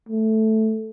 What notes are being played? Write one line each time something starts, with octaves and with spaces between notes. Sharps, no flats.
A3